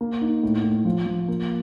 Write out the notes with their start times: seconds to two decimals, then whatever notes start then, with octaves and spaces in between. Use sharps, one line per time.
0.01 A#3
0.21 D#4
0.43 A2
0.64 A2
0.85 F3
1.06 F3
1.28 A#3